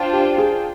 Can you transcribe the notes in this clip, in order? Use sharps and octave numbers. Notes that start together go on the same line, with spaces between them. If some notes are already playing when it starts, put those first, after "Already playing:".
Already playing: D4 F4 C5 G5
G4
G#4